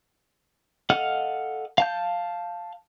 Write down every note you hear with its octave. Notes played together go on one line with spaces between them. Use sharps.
A4 D#5 F5 F#5 F6
F5 A5 G6